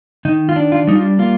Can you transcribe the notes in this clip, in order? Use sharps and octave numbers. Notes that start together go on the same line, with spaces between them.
D#3 D#4
F4
D4
F4
G3 D#4
F4
A#3 F4